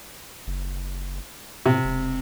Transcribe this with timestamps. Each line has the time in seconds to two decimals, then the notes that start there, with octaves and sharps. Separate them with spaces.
0.47 F#1
1.66 A2 C3
1.84 E1